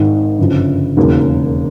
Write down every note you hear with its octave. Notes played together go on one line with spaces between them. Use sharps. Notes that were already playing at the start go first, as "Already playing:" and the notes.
Already playing: G#1 G#2 D#3
G1 F#2 C#3 F3
E1 D#2 C#3 F#3 A#3